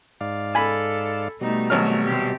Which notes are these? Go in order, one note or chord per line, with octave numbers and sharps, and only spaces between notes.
G#2 D5 F5
A4 G#5 B5
B2 G3 A3 D#4
G#1 F#3 A3 F6
C3 G4